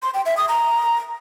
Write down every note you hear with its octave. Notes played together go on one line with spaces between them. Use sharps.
C6
G5
E5
D#6
A#5